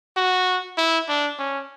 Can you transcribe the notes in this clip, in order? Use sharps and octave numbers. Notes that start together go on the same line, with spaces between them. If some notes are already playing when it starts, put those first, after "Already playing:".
F#4
E4
D4
C#4